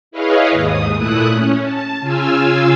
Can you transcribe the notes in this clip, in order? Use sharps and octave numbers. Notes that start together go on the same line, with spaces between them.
E4 G#4 B4 C#5 D#5 F5
D#2 G#2 D#6
A#2 A3 E4 D#6 F#6
C#4
A5
C#3 F4 F5 G#5 E6